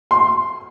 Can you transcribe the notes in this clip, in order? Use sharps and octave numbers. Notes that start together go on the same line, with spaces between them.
C6